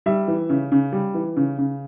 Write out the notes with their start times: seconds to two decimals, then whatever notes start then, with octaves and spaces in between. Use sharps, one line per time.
0.06 G3 E5
0.28 E3
0.50 C#3
0.72 C#3
0.92 G3
1.14 E3
1.37 C#3
1.58 C#3